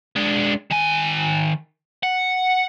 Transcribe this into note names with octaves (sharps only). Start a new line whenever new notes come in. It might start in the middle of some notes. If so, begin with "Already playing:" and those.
G#3 D4
D#3 G#5
F#5